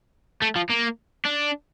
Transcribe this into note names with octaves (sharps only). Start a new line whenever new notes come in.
A3
F3
A#3
D4